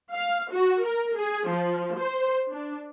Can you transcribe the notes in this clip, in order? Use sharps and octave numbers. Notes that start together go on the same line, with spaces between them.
F5
F#4
A#4
G#4
F3
C5
D4